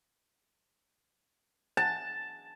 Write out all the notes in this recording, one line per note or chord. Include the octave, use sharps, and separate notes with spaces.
A5